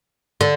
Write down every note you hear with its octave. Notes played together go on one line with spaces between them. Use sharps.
D3